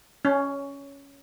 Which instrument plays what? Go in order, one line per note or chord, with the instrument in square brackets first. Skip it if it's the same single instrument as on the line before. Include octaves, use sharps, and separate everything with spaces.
[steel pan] C#4